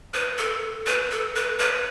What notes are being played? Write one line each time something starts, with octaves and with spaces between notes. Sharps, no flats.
B4
A4
B4
A4
B4
B4